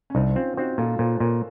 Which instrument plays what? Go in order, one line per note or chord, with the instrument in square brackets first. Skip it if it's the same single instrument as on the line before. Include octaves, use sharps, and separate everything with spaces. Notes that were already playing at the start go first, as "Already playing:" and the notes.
[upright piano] C#4
[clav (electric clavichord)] C2 [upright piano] C4 D#4
[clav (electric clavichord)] C4 [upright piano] C#4 F4
[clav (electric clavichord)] C4 [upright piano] D#4 F#4
[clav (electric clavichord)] A#2 [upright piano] F4 A4
[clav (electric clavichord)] A#2 [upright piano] A4 C5
[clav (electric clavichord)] A#2 [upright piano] A#4 C#5